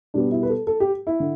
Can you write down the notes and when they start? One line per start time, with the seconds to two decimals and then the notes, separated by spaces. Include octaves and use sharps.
0.14 B2 G3 B3 D4
0.32 E4
0.43 B4
0.49 A4
0.67 A4
0.80 G4
1.07 E4
1.20 D3